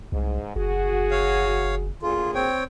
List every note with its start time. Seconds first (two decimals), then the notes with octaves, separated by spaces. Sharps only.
0.12 C2 G#2
0.56 F#1 F#4 G#4
1.11 C#5 F5
2.02 D2 A#2 F4 G#4
2.35 C4 C#5 G5